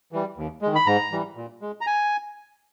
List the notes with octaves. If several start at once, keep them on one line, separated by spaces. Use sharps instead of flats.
E3 G3
D#2
G#3
D#3
B5
G#2 A#5
E3 G3
A#2
G#3
A#5
G#5